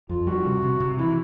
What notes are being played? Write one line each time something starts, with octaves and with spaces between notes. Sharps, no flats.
F2 F4
G3 F#4
C3
C3
C3
E3 E4